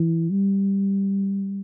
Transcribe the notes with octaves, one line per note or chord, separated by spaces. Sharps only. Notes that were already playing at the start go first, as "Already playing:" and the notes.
Already playing: E3
G3